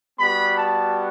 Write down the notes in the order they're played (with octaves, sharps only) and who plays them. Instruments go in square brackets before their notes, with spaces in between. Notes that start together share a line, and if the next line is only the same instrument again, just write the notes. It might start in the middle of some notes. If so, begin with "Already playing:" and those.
[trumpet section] G3 B3 F#4 B5
A5